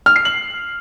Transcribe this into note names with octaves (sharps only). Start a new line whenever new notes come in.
F6
C7
F#7